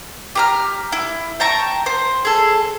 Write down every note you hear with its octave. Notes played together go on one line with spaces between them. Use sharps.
G4 A#5 F6
E4
G5 A5 A#5 C#6
C5
G#4 A4